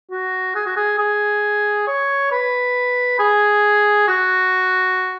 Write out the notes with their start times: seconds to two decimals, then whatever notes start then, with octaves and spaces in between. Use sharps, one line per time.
0.11 F#4
0.55 G#4
0.66 F#4
0.76 G#4
0.99 G#4
1.87 C#5
2.32 B4
3.19 G#4
4.08 F#4